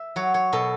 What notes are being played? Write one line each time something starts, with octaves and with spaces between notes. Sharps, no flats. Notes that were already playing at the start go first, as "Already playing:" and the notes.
Already playing: E5
F#3 C#5
C#5
B2 A4